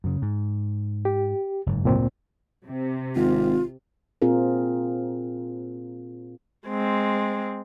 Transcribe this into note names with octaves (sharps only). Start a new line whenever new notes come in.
F#2 C#3
G#2
G4
F#1 G#2
D2 A#2 C4
C3
G#1 F4
A#2 C4 F4 G#4 A#4
G#3 C4